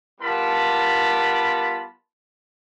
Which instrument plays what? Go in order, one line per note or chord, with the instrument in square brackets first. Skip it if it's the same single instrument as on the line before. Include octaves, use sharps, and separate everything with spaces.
[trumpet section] G3 B3 F4 A#4 A5 B5